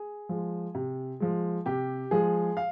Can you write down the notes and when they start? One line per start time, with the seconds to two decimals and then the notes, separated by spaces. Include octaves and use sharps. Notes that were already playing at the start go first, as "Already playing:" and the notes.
Already playing: G#4
0.29 F3 G#3
0.75 C3
1.20 F3 G#3
1.66 C3 G4
2.11 F3 G#3 G#4
2.57 F5